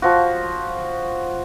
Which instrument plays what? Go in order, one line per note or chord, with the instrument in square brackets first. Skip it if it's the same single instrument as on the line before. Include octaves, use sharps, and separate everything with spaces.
[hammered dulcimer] F3 F#4